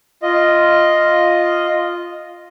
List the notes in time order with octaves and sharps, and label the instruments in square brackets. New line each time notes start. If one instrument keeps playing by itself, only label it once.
[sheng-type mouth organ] F4 D#5